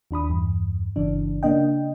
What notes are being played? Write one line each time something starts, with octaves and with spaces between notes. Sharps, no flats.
D#2 D4 B5 D#6
E2 G2
G1 C#3 E3 D4
C#3 A#3 D4 D#5 G5